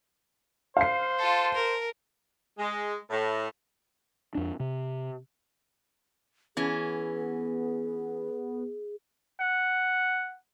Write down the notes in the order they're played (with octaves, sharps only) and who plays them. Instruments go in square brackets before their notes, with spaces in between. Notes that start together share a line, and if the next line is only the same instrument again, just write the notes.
[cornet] C5 [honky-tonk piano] F5 C7
[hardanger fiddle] F4 A4
A#4
[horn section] G#3
A2
[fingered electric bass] F2 D4
C3
[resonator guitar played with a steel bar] E3 C#4 [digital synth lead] B3 [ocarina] G#4
[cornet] F#5